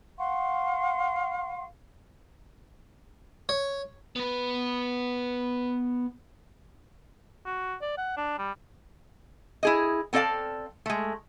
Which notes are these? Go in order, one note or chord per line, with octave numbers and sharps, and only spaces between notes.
F5 F#5 C6 C#6
C#5
B3 B4
F#4
D5
F#5
D4
G3
E4 G#4 D#5
B3 C4 A4 D5 F5 A5
G#3 A3